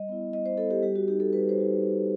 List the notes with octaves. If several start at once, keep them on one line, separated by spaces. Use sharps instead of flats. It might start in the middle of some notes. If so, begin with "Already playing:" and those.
Already playing: G3 D#5
B3 E4
G3 D#5
C5
B3 E4 A4
G4
G3 G4
F#4
D#4 F#4 G4
A4
G3 B4
C5
D#4 F#4